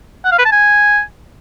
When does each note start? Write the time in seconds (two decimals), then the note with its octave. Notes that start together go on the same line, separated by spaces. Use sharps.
0.25 F#5
0.31 F5
0.38 B4
0.45 A5
0.52 G#5